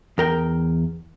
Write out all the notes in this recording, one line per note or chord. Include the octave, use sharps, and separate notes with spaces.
E2 A#4 G5